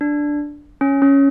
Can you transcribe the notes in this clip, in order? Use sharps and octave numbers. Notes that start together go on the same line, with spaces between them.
D4
C#4
C#4